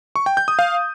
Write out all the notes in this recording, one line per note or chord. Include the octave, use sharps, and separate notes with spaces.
C#6
G5
G6
D#6
F5